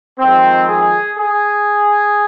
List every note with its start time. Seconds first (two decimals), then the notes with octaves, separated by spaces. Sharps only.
0.19 F2 D#3 G#3 C4
0.68 G#4
1.17 G#4